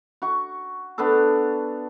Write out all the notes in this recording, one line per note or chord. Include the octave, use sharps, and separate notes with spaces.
F#4 C#6
B3 D4 A4